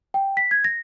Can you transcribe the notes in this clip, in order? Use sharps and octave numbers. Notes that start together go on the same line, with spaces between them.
G5
B6
G#6
A#6